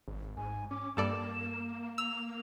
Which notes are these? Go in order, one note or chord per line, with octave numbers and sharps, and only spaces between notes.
G#1
G#2 G#5
C#4 D6
G2 A#3 A4 D5 E7
E6 F7